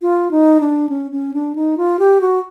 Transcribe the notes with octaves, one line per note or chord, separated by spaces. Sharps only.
F4
D#4
D4
C#4
C#4
D4
D#4
F4
G4
F#4